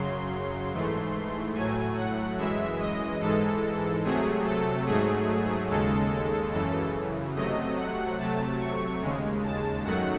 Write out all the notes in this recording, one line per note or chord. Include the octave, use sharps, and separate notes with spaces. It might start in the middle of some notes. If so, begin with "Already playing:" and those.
Already playing: F#2 C#3 F#3 C6
G#2 E3 A3
A2 F#3 A3 G#5
F#5
F#2 E3 G#3 E5
D#5
G#2 E3 G#3 A4
C3 F#3 A3 G#4
A4
G#2 F#3 A3 G#4
D#2 C#3 G#3 A4
F#2 C#3 E3 A4
C3 F#3 A3 D#5
F#5
C3 F#3 A3 A5
C#6
D#2 C#3 G#3
A5
F#2 D#3 F#3 A3 F#5